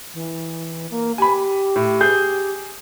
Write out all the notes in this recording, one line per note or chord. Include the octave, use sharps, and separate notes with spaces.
E3
A#3
G4 G#5 B5
A2
G#4 G6